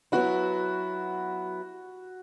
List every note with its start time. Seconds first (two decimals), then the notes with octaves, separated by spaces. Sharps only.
0.12 F#3 B3 E4 F#4